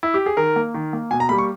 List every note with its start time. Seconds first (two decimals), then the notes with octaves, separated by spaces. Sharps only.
0.03 E4
0.14 G4
0.26 G#4
0.37 D#3 A#4
0.56 A#3
0.74 D#3
0.93 A#3
1.11 B2 G#5
1.20 A#5
1.29 G3 A#3 B5
1.38 C#6